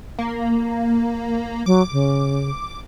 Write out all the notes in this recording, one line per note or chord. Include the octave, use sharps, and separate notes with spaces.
A#3
F#3 D6
C#3